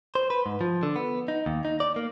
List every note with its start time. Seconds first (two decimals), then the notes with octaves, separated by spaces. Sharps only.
0.15 C5
0.30 B4
0.46 G#2
0.61 F3
0.83 D3
0.96 B3
1.28 D#4
1.46 D#2
1.65 D#4
1.80 D5
1.96 A#3